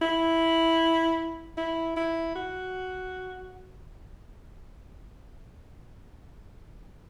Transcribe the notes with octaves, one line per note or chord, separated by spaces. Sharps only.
E4
E4
E4
F#4